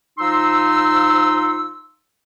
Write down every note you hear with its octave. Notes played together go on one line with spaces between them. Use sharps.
F3 D#4 C6 E6